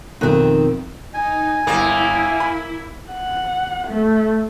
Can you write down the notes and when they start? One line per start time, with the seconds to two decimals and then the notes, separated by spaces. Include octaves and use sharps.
0.21 B1 F2 D#3 C4 F#6
1.14 D#4 G#5
1.67 G1 A#3 E4
2.40 B5
3.11 F#5
3.88 A3